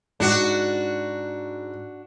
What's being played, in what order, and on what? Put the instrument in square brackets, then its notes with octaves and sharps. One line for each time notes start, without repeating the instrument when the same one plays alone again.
[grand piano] G#2 [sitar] D4 F#4